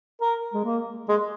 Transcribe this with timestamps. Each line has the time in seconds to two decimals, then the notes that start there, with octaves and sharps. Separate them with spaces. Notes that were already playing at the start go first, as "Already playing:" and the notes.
0.22 A#4
0.54 G#3
0.64 A#3
1.09 G#3